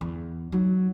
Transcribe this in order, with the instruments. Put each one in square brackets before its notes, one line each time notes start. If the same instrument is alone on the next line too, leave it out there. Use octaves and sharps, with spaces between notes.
[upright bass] E2
[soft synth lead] F#3 [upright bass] D#4